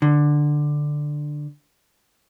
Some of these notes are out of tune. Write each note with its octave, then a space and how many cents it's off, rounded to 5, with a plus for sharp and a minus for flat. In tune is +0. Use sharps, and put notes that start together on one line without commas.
D3 +10